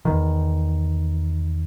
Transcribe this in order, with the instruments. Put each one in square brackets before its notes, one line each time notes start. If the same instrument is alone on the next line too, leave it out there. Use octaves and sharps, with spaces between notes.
[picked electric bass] E2 D#3